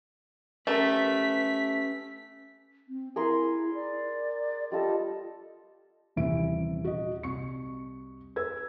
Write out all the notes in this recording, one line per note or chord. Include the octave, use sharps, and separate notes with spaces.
A3 C#4 G4 A#4 B4 B6
C4
E4 G#4 A#4 C6
D5
G3 F4 A4 D#5
D#1 C3 E3 E5 D7
F#4 D#5
C2 C#6 C#7
B4 E6 G#6